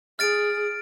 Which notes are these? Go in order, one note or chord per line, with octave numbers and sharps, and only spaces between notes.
G#4 F6 A6 D7